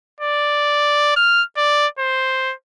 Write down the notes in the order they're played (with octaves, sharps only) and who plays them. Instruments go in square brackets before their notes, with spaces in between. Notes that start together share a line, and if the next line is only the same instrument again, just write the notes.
[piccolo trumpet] D5
F6
D5
C5